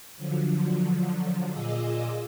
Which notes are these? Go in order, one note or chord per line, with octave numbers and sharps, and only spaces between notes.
D3 F3 F#3
A#2 F4 G#4 D#5 D6 E6